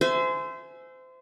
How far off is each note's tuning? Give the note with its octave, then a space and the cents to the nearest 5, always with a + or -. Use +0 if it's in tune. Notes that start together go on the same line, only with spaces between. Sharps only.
C5 -25 E5 +5 G#5 +20